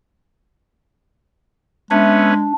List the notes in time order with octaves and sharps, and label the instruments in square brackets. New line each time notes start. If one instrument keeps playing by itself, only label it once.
[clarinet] G#3 [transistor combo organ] B3 C#4 [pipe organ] D4 [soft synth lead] E5